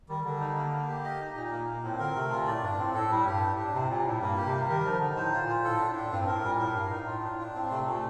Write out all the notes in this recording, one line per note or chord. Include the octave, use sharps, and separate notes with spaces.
D#3 G3
D3 G3
D#4
A#3
A#3
G4
D#5
D#4
A#2 D#4
A#3
A#3
A2 C4
D3 A#4
C3 A3
A#2 F4
A2 D5
G2 D4
A2 C4
A2 A4
A2 G3
G2 G4
D4
A2
D4
C3 C4
A#2 G3
A2 G3
G2 A#3
G4
C3
G3
D#3 A#4
F3 D#4
D3 D#4
A2 C5
F4
A#2
F4
A2 A4
D4
A2
D4
G2 C4
A2 A#4
A#2 G3
A2 A#4
G2 F5
A2 D#4
A2 F4
D4
A2
D4
A2 C4
C3 A3
A#2 A3